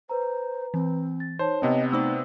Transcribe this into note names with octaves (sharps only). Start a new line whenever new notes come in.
B4 C5 A#5
E3 C4
A6
D#4 C5 C#5 A5
C3 B3 C4 D#5
A3 D#4 C5 D5 E6